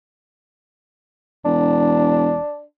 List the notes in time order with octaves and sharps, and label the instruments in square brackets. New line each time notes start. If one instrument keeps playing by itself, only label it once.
[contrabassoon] E1 [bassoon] D4